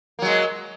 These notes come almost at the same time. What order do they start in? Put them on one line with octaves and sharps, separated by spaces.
A#3 F#3 G#3